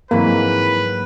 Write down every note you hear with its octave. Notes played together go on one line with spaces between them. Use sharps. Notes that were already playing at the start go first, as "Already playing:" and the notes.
G#2 E3 F#3 A#3 C4 B4